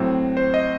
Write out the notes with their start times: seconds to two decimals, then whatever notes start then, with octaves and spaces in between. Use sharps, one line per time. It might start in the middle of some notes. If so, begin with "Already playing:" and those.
Already playing: A2 F#3 C4
0.37 C5
0.54 D#5